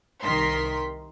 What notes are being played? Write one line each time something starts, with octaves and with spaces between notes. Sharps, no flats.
C2 D#3 A#4 C6 B6